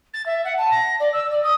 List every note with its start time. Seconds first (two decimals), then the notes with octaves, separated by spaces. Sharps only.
0.13 A6
0.25 E5
0.44 F#5
0.57 A5
0.71 A#6
0.99 D5
1.12 E6
1.30 D5
1.43 D#6